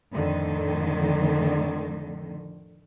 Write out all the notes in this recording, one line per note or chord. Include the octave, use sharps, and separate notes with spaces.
F2 A2 D3 D#3